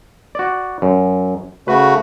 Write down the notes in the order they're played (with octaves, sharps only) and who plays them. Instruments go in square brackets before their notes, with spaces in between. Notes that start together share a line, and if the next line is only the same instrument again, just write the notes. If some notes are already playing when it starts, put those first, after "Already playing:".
[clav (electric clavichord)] F#4 D5
F#2
[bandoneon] C#3 A3 F#4 [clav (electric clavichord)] B4